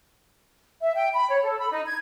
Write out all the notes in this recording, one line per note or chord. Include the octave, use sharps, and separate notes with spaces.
E5
G5
B5
C#5
A4
B5
D#4
G#6